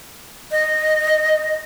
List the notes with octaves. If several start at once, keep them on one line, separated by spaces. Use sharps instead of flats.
D#5